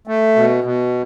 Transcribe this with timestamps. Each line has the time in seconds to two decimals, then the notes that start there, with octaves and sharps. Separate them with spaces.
0.07 A3
0.36 B2
0.64 B2